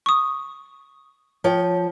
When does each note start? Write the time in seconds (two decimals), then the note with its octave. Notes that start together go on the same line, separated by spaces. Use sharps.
0.06 C#6 D#6
1.44 F3 C#5 G5